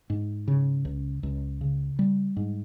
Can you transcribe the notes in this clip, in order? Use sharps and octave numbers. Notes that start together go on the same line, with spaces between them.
G#2
C#3
C#2
C#2
C#3
G3
G#2